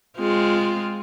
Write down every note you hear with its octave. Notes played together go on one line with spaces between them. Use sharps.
G#3 C4 F4